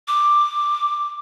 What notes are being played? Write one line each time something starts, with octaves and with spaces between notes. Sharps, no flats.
D6